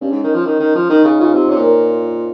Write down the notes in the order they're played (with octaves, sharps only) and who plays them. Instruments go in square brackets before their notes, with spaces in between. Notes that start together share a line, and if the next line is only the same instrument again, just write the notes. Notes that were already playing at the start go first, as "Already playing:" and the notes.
[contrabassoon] G2 [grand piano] C#4
[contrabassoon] G#2
D#3
F3
D#3
D#3
F3
[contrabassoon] D#3 [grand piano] D#4
[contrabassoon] C#3 [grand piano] D#4
[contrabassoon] C#3 [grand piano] F4
[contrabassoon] C3 [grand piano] C5
[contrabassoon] C3 [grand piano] C#5
[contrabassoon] A#2
[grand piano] A#4